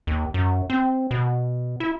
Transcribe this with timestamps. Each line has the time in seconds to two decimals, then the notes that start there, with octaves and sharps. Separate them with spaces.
0.07 D#2
0.34 F#2
0.70 C4
1.11 B2
1.80 E4